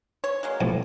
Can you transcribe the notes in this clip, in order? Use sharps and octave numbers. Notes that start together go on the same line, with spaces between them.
C#5
F#3 G#3 A#3
B1 F2 A2